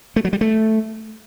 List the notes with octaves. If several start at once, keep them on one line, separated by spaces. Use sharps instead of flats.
A3
F#3
G3
A3